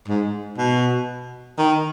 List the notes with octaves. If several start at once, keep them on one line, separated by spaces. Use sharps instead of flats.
G#2
B2
D#3